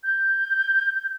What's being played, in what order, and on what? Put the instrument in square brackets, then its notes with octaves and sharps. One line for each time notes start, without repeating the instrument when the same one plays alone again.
[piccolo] G6